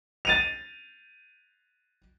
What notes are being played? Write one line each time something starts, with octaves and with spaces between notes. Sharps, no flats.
A6 D#7 F7